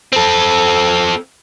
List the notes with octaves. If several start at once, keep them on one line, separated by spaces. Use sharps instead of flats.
C4 A4